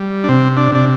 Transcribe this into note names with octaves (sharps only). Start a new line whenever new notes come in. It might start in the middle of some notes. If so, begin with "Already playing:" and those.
Already playing: G3
D4
C3 C4
D4
C3 D4